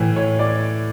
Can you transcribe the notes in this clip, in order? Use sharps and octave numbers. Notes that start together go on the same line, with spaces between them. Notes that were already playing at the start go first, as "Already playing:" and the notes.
Already playing: A2 E3
C#5
D5